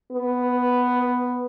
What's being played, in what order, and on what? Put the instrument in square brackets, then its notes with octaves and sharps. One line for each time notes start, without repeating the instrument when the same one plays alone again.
[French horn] B3